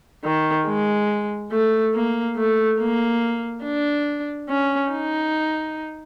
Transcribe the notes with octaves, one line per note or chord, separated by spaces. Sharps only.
D#3
G#3
A3
A#3
A3
A#3
D4
C#4
D#4